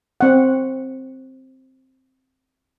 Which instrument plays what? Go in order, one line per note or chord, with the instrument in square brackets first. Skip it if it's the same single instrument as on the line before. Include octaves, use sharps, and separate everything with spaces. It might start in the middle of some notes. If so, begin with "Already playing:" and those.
[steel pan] C4 F#5